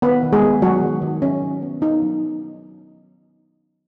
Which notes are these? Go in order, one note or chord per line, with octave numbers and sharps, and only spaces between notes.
D#3 B3 B4
D#3
G#3 G#4
B3
F#3 B3 F#4
D#3
D#3
F#3 C#4
F#3
B3
B3 D#4
F#3